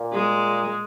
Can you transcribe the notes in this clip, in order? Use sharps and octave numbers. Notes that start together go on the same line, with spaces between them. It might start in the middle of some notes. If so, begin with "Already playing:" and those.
Already playing: A#2
G#3